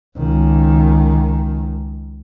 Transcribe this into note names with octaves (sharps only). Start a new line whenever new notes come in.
C#2 D#3